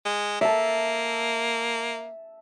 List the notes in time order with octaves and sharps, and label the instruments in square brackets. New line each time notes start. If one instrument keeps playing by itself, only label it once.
[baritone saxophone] G#3
[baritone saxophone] A#3 [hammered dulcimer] E5 A5